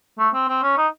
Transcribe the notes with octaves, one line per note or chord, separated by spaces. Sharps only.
A3
C4
C4
C#4
D#4